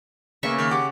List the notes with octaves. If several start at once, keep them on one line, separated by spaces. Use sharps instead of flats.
C#3 A#3 B3 E5 C#6
D#3 A#3
G4 F#5 D6